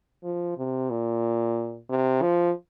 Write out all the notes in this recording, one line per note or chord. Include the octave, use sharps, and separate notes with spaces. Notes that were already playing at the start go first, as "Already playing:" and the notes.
F3
C3
A#2
C3
F3